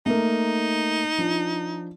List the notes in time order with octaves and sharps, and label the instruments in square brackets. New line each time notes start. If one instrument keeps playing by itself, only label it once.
[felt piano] A3 A#3 [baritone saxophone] D#4
[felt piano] F3 D4